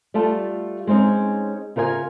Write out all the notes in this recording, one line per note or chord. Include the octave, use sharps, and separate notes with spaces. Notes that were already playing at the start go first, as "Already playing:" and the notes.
G3 A3 F4 A5
G#3 C4 C#4 D#4
C#3 F4 A#4 C#5 G#5